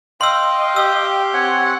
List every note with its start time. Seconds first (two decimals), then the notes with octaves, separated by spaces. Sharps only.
0.21 D#5 F5 G5 C6 E6
0.76 G4 E6
1.34 C4 C#5 F#5 G#5